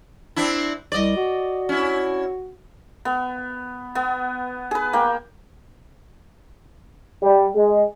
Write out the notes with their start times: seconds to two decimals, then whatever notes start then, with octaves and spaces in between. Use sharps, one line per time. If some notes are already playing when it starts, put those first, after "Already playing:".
0.36 C4 D4 E4
0.92 C2 D5 D#5
1.17 F#4
1.69 C#4 E4
3.05 B3
3.95 B3
4.71 G#4 B4
4.93 A#3 G5
7.22 G3
7.55 G#3